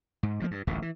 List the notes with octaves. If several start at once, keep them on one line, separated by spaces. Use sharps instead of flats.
G#2
G2 F3 A#3
G2
D1 A1 D#2 A#2
E3